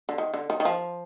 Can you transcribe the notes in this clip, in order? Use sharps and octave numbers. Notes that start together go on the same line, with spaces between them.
D3
D#3
D3
D#3
D#3
F3